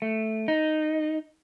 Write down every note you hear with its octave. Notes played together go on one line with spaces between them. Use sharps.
A3
D#4